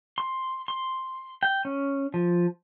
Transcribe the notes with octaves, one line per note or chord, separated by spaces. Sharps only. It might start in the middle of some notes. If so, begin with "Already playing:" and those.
C6
C6
G5
C#4
F3